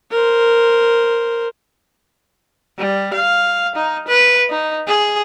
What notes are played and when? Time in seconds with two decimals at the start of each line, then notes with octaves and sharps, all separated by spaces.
0.11 A#4 C5
2.79 G3
3.14 F5
3.76 D#4
4.08 B4
4.50 D#4
4.88 G#4